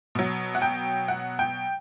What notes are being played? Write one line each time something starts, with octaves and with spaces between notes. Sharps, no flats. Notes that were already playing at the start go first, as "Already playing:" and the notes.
B2 F#3
F#5
G5
F#5
G5